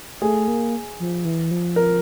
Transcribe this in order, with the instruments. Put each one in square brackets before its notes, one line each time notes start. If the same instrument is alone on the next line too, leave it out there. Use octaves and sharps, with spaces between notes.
[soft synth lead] A3 [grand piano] G#4
[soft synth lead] A#3
F3
E3
F3
[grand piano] A#4